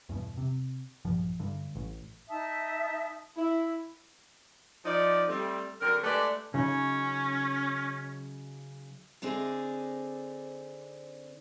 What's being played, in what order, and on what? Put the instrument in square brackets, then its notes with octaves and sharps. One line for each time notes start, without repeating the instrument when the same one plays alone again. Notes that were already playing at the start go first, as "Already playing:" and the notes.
[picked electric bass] E2 G2 B2
C3
A#1 G2 F3
G2 D3
A1
[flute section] D#4 E5 A5 D#6
[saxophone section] E4
F3 D#4 D5
G3 A3 C4
D3 F#3 C4 A#4
G#3 A3 D4 G4 B4 D5
[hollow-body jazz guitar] C#3 F#3 D#4 [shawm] C#4
[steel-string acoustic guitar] D3 C4 D4 D#4 G#4